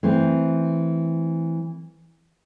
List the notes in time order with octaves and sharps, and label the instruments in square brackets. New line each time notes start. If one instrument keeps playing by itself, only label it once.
[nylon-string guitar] E3 A3 C4